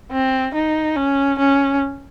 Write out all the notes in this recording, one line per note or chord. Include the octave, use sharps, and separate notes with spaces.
C4
D#4
C#4
C#4